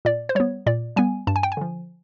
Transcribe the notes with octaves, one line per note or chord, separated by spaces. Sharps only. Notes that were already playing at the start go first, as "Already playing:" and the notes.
A#2 D5
C5
G3 B3 C#5
A#2 D5
G3 B3 G#5
G2 A5
G#5
G5
G#5
D3 F3